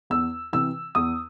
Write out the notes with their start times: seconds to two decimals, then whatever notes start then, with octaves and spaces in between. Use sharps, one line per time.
0.10 E2 E6
0.53 C3 E3 E6
0.95 E2 D#6